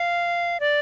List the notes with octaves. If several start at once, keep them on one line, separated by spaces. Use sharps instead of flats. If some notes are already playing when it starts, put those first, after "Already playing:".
Already playing: F5
D5